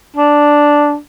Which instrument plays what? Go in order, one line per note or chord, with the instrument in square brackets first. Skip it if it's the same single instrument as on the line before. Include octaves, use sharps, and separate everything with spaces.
[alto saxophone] D4